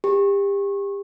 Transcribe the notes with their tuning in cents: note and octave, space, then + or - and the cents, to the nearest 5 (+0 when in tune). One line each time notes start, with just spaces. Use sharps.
G4 +30